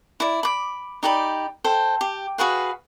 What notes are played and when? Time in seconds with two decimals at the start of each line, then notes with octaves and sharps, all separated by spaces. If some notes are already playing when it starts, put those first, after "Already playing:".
0.20 E4 D5
0.43 B5 D6
1.03 D#4 G4 D5 B5
1.64 A4 C5 G5
2.01 G4
2.38 F#4 G#4 B4 F5